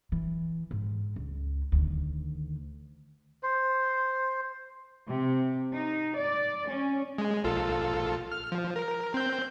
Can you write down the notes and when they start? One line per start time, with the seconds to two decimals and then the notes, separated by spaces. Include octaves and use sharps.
0.12 E3
0.71 G#2
1.16 C#2
1.72 D2 D#3
3.43 C5
5.08 C3
5.73 D#4
6.17 D5
6.67 C#4
7.18 G#3
7.44 A#1 F4 A4
8.32 F6
8.52 F3
8.76 A#4
9.14 C4 G6